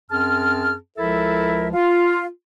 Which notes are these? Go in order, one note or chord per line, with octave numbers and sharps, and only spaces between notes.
F#2 C4 G#4 A5 F6
C#2 F3 E4 A4 A#4 E5
F4